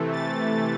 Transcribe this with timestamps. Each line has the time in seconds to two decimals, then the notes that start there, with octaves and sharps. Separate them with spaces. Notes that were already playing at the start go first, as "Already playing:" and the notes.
Already playing: C3 E3 A3
0.12 A6